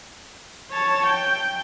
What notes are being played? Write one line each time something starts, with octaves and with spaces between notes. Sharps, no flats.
C#5 A5
G5